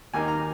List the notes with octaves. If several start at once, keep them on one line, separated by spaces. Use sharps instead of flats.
D#2 D#3 A#3 D#4 G#5
A#5